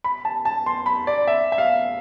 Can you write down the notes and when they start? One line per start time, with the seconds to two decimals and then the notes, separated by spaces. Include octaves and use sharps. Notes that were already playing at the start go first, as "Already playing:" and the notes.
0.04 B5
0.25 A5
0.45 A5
0.66 C6
0.86 B5
1.07 D5
1.27 E5
1.52 E5
1.58 F5